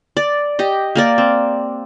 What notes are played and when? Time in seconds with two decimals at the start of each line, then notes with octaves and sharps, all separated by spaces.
0.17 D5
0.59 G4 D#5
0.95 A#3 A#4 D5
1.18 C4